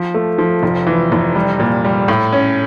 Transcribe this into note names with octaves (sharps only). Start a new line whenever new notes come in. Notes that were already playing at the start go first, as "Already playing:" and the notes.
Already playing: F3
A3
F3
F1
E3
F1
G3
A#2
G3
A2
C#4